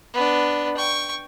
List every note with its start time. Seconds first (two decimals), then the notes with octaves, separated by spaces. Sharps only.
0.14 B3 D4
0.77 G5 C#6